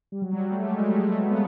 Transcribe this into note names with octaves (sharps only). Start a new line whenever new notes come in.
G3
F#3
G3
A3
G#3
G3
G#3
A3
B3
A#3